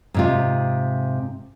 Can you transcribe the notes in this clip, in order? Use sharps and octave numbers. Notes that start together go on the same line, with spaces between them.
G#2 C3 F4